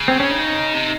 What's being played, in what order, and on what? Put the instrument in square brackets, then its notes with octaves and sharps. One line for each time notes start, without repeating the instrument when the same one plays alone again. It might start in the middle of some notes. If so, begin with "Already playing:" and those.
Already playing: [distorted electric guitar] C#3
[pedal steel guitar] C4
C#4
D#4
[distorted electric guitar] C3